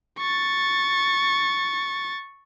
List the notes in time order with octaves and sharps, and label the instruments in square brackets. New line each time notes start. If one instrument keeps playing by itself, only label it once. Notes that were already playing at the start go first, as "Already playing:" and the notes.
[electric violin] C#6 A6